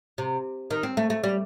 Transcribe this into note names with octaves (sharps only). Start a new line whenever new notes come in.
C3
D#3
C4
A3
A3
G3